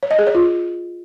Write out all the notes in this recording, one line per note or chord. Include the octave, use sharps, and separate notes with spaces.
C#5
D#5
G#4
C#5
F4